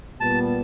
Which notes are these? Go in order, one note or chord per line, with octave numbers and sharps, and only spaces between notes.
A#2 G3 B3 A5